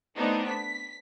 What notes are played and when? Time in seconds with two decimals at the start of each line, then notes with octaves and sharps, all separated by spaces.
0.17 A3 B3 C4 D4 D#4
0.49 B6